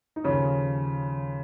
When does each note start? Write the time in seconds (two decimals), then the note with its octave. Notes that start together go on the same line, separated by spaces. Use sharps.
0.16 D#4
0.24 D#2 C#3 F3 C#4